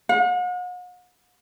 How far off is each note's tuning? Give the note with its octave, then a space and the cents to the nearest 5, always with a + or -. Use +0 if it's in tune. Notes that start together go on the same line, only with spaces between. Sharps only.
F#5 -45